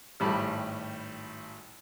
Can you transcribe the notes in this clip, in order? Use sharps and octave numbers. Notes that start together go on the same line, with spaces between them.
G#1 A2 G3 B5